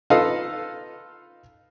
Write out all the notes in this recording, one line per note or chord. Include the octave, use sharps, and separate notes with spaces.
D#4 F4 A4 B4 D#5 F5